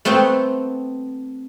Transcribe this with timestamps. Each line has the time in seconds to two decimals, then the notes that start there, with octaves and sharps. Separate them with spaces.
0.05 A3 B3 C4 F#5 G5